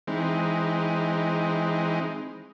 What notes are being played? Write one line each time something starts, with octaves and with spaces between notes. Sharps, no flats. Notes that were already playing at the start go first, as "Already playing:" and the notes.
E3 G#3 C4 D#4